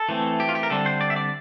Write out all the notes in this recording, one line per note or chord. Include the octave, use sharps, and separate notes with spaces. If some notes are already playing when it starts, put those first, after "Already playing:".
Already playing: A4
E3 A3 C4
G4
F4
G4
A#4
D3 G3 C4 A4
C5
D5
E5
D5